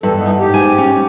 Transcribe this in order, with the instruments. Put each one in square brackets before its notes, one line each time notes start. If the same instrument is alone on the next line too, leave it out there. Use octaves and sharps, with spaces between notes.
[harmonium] E2 E3 A4 [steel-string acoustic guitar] G2
[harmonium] E3 B3 D#4
G#2 G4
[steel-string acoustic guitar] G#5
C#4